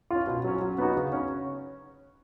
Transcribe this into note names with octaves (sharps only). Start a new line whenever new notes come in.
C#4 F4
B2
F#3 C#4
F#3
B3 D#4 F#4
C#3
C#4